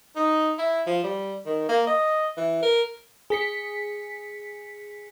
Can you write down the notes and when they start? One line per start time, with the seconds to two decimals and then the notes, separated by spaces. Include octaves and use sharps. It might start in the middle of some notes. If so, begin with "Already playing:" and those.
0.16 D#4
0.59 E4
0.87 F3
1.04 G3
1.46 D#3
1.69 A#3
1.87 D#5
2.37 E3
2.62 A#4
3.30 G#4 B6 C#7